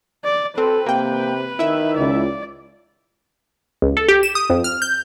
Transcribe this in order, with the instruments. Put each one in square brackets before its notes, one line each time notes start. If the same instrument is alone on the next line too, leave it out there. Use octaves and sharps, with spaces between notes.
[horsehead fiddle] D5
[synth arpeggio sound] C4 [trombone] A4 [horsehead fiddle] B4
[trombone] C3 [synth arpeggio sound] A#3 G5
[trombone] D#3 [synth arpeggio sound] E4 E5
[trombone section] C#2 [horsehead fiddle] D5
[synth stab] C#2
A4
G4
E7
D#6
F2
F6
G6